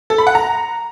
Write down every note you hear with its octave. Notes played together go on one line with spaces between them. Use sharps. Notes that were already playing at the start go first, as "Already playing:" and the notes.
A4
B5
F#5
A#5